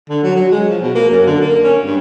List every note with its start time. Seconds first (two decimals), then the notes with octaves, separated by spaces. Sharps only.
0.09 D3
0.23 F#3
0.36 F#3
0.51 G#3
0.68 F3
0.82 B2
0.95 A#3
1.11 F#2
1.26 D3
1.41 A#3
1.64 C#4
1.84 G2